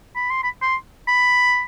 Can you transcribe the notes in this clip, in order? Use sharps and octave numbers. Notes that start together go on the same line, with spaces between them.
B5
C6
B5
C6
B5